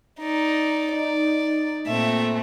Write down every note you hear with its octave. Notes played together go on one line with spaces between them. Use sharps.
D#4 D5
D#4 D5
A#2 A3 C4 E5